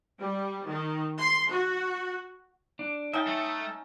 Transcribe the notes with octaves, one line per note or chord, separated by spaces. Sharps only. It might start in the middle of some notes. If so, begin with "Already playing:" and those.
G3
D#3
C6
F#4
D4
C#4 D#4 E5 G5 A5
A3